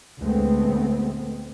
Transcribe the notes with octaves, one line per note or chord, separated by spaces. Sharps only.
D2 A#2 G#3 A3 B3 C4